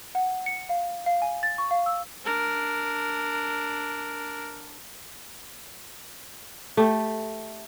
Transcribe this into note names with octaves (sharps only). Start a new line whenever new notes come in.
F#5
C#7
F5
F5
G#5
A6
C#6
F5
E6
D4 A#4
A3 G4